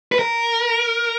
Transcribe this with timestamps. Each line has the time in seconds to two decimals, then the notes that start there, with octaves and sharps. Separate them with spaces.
0.12 B4
0.19 A#4